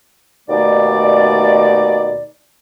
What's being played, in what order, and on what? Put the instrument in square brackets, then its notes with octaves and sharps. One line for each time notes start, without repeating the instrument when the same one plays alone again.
[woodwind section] D#2 B2 A3 D#4 D5